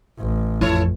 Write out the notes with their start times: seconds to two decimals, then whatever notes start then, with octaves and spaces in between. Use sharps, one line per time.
0.19 A1
0.61 F2 E4 A4 C#5